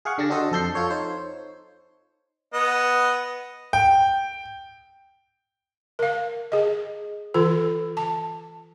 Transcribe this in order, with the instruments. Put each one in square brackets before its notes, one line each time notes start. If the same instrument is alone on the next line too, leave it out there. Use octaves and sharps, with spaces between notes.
[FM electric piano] G#4 F5 F#5 C#6
D3 D4 G4 A5 A#6
D4 F#4 A4 C5 D#5
F2 A4 G6 C7
F4 A4 C#5
D#4 C5 C#5
[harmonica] B3 D#5
[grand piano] G5
[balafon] A#4 F5
G#4 D#5
E3 F4 A4
A5